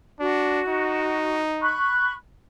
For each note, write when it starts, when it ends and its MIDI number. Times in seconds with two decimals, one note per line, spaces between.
0.20 0.62 62
0.20 1.40 66
0.68 1.78 63
1.61 2.13 83
1.61 2.13 85
1.61 2.13 90